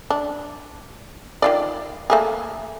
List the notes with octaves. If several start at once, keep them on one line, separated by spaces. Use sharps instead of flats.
D4
D#3 F4 D5
A3 A#3 G#4